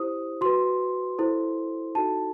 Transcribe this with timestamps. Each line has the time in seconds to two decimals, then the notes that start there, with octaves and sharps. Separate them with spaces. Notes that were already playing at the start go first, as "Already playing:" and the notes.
Already playing: E4 G4 C5 D#6
0.41 F#4 B4 C6
1.18 E4 A4 C5
1.95 D#4 F#4 A4 A5